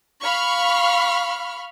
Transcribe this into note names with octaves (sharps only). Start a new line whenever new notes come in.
F5 B5 C#6 F6